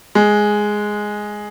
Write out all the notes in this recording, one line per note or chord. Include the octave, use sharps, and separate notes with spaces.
G#3